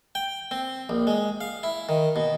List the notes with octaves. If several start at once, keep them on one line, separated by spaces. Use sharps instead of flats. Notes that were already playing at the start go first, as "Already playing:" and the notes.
G5
C4
A#1
G#3
F5
E4
D#3
B2